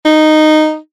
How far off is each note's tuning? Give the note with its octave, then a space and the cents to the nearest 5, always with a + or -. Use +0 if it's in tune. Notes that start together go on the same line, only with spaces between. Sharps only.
D#4 -10